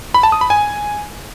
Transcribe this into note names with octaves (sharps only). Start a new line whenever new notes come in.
B5
A5
D#6
B5
G#5